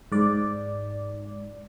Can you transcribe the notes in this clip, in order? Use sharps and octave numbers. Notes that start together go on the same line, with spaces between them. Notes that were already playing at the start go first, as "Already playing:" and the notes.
G#2 D5